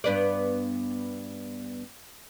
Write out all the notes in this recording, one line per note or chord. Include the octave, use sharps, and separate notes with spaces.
G2 B3 D5